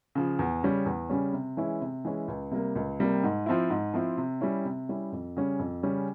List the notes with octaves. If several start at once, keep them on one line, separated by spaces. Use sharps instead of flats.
C#3 F3
E2
C#3 G3 C#4
E2
C#3 G3 C#4
C3
E3 G#3 C#4 E4
C3
E3 G#3 C#4 E4
C#2
C3 G3 A#3
C#2
C3 G3 A#3
G#2
F3 C4 E4
G#2
F3 C4 E4
C3
G3 C#4 E4
C3
G3 C#4 E4
F2
C#3 G3 C#4
F2
C#3 G3 C#4